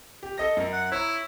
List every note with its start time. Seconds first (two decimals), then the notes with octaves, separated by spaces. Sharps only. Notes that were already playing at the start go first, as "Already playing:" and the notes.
0.23 G4
0.38 A4 D#5 A#6
0.57 F#2 A#4
0.73 F#5
0.92 E4 C#5 A#5